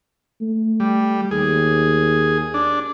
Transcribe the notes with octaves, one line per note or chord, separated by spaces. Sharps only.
A3
G3
D#2 G#4
D4